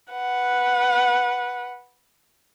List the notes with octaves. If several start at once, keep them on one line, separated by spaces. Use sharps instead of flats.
B4 F#5